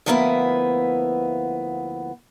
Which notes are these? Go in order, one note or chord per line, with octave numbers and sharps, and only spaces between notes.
D2 F3 A#3 B3 E4 E5